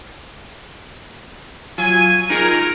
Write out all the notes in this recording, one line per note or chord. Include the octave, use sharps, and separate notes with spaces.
F#3 F4 G#5
D#4 F4 G#4 A#4